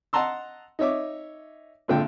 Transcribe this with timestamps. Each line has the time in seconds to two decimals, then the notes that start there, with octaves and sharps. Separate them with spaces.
0.13 D#5 F#5 A5 A#5 C6 E6
0.79 D#4 C#5 E5 D6
1.88 G#1 A#2 D3 F4 G5